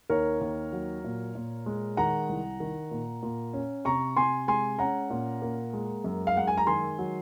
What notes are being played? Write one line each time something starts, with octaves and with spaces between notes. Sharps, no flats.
D#2 A#4 C#5
D#2
F#3
A#2
A#2
G#3
D#3 F#5 A#5
C2
D#3
A#2
A#2
C#4
C3 A#5 C#6
C3 G#5 C6
G#3 G#5 C6
C#4 F#5 A#5
A#2
A#3
G#3
F#2
F5
G#3 F#5
G#5
A#5
D#3 G#5 C6
F#3